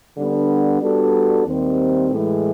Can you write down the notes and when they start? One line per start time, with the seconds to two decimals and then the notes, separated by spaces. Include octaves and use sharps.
0.17 D3 G3 B3 D4
0.82 G3 B3 D4 F#4 A4
1.46 D#2 D#3 G3 C4
2.11 A2 E3 G#3